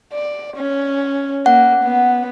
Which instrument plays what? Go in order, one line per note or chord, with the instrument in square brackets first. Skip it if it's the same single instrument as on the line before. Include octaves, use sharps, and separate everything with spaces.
[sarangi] D5
C#4
[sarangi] A#3 [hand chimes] F#5
[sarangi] B3